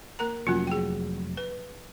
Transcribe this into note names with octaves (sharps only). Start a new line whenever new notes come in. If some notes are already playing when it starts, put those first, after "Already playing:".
A#3 A#4 A#5
F1 F#3 A#3 C#4 F4
G#4 G5
B4